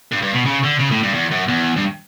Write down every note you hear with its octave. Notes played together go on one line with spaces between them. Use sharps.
G2
G2
B2
C#3
D3
C#3
A2
G2
E2
F#2
E2
G2